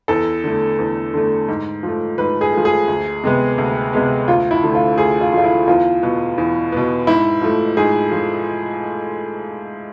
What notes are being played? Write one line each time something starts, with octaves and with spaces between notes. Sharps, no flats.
E2 A4
D3 A3
E2
D3 A3
G#2
F3 A3
G#2 B4
G#4
F3 A3
G#4
D2
C3 G#3 B3
D2
C3 G#3 B3
D2 F4
E4
D3 F3 A3
F4
D2 G#4
F4
D3 F3 A3 F4
E4
E2 F4
B2 B3
E2
B2 B3
G#2 E4
F3 A3
G#2 G#4
F3